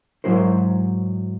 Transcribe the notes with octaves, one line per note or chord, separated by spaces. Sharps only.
G#2 C3 F#3 E4 A#4 C5